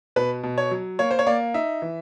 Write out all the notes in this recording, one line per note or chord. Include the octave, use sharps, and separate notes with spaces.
B2 B4
B2
C#5
F#3
A#3 C#5
C5
C#5
A#3 D5
D#4 E5
E3